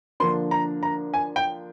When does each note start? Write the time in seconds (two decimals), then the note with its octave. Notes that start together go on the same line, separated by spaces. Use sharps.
0.20 D3 F3 A#3 D4 C6
0.51 A#5
0.83 A#5
1.14 G#5
1.36 G5